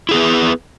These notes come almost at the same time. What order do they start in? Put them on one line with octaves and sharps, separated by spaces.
E4 G#4 B3 B4